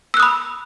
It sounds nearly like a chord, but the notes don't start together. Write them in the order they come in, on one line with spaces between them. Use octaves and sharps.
E6 F#6 D#6 B5